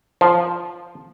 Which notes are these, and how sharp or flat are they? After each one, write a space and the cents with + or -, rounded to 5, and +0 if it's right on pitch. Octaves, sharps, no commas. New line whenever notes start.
F3 -5